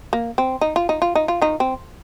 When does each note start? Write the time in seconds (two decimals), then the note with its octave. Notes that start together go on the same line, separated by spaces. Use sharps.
0.13 A#3
0.38 C4
0.61 D#4
0.76 F4
0.89 D#4
1.02 F4
1.15 D#4
1.28 F4
1.42 D#3 D#4
1.60 C4